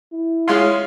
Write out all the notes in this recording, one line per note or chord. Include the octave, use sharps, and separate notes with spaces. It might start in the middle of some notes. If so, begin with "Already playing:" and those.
E4
G#3 C#4 F4 F5 C6